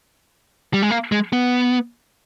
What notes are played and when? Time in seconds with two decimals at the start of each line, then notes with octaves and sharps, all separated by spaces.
0.74 G3
0.82 G#3
0.90 A#3
1.12 G#3
1.33 B3